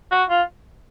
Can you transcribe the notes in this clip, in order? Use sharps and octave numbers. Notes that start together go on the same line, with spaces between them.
F#4
F4